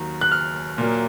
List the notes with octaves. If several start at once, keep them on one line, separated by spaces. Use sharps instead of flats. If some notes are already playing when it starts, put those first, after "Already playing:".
Already playing: D#2 D#3 F#3 A#5
F#6
F6
A#2 F#3 A#3